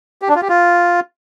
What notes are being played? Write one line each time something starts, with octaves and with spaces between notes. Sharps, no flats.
G4
D4
F4
G4
F4